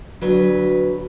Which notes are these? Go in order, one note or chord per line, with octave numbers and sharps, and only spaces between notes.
D2 F#3 B4